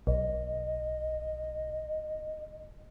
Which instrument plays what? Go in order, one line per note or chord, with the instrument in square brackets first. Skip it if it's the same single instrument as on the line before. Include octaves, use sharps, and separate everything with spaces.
[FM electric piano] B1 [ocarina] D#5